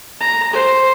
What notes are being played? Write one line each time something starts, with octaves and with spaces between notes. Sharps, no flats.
A#5
C5